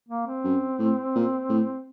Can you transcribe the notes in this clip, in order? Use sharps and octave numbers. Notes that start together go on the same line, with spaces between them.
A#3
C4
F#2
A2
A#2
A2